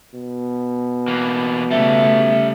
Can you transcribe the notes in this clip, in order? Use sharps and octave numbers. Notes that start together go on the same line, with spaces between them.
B2
E3 A#3
C#3 G3 A3 A4 E5